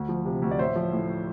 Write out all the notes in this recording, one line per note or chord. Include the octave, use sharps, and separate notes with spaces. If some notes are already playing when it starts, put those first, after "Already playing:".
Already playing: D2
F3
C3
D2
D5
A1 C5 E5
F3
A2